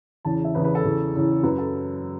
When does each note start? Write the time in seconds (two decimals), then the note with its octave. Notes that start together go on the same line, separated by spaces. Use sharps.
0.25 E2 C#3 E3 A5
0.44 E5
0.55 E2 C#3 E3 B4
0.65 B4
0.75 A4
0.84 E2 C#3 E3
1.14 E2 C#3 E3
1.43 F#2 F#3 B4
1.58 A4